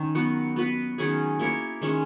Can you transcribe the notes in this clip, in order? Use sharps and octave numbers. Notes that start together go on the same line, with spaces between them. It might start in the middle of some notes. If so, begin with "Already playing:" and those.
Already playing: D#3 C#4
F#3 B3 F#4
B3 F#4 B4
D#3 F#3 C#4 G#4
A#3 E4 A#4 C#5
D#3 G#3 C#4